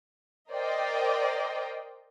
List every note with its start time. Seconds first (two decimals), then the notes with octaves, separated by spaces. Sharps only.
0.53 A#4 C5 D5 D#5 G5